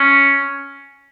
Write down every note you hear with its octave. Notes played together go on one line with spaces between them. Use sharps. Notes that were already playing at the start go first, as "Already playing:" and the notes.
Already playing: C#4